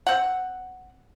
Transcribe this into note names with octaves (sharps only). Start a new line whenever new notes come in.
C4 F#5